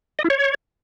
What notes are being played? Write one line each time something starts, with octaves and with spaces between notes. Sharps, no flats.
D#5
E4
C#5